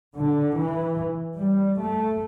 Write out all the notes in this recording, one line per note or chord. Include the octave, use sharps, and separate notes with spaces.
D3
E3
G3
A3